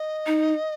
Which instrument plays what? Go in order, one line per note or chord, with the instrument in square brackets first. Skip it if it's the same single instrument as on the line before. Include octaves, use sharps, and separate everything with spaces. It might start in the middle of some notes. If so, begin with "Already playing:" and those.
Already playing: [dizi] D#5
[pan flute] D#4